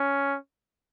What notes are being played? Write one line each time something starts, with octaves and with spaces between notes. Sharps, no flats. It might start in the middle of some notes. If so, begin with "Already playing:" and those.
Already playing: C#4